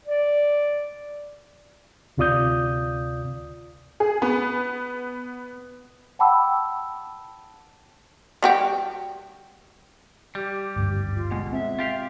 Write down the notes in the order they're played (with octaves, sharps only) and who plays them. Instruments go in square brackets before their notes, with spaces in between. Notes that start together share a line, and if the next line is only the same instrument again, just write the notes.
[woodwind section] D5
[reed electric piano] D2 C3 F4 D5 D#6 G6
[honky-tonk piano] G#4
B3
[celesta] F#5 G5 A5 B5 D6 E6
[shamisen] G3 F#4 G4
[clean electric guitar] G3 [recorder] G4
[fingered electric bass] G#1 D2 G2
[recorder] F4
[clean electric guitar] B2 G#3
[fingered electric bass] C4 [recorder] E5
[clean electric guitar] F4 G4 F5